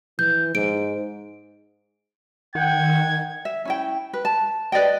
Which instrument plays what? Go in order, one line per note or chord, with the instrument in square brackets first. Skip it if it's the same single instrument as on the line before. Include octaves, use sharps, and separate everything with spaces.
[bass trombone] E3 [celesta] G6
[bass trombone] G#2 [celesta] D7
[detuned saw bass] D#3 [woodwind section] F#5 G5 [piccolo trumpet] G#6
[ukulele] E5
C#4 E4 G5
B4
A5
B4 D5 D#5 G5